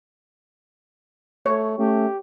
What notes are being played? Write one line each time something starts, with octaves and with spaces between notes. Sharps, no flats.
A3 C#5
A3 C#4 G4